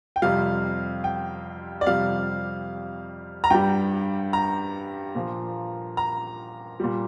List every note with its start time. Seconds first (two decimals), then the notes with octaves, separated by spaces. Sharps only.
0.16 G5
0.22 F2 C3 G3 F5
1.04 G5
1.81 D5
1.86 F2 C3 G3 F5
3.44 A#5
3.50 G2 G3 G5
4.33 A#5
5.15 A#2 F3
5.97 A#5
6.80 A#2 G3